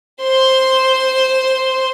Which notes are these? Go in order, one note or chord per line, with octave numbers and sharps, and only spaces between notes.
C5 C6